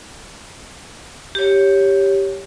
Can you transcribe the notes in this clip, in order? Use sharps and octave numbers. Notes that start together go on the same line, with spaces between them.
G4 C#5